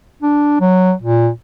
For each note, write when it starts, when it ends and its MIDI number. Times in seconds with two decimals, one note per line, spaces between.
0.22 0.58 62
0.60 0.93 54
1.02 1.30 46